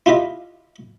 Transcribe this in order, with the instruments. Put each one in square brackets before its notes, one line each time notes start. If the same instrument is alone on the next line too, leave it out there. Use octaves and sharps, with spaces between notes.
[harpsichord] E4 F4 G4 B4 D#5